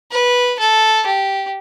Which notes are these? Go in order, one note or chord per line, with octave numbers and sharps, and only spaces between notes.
B4
A4
G4